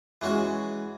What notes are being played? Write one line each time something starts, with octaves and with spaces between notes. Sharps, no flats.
E3 G#3 C#4 F#4